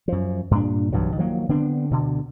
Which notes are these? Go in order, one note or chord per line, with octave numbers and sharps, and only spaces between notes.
F#2 F3
G2 A#2 D4
B1 G2 E3 F#3
D#3 F3 F#3 A#3
D3 B3 C4 D4
D2 B2 D3